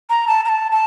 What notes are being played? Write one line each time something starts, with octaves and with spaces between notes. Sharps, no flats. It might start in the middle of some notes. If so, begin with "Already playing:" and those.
A#5
A5
A#5
A5
A5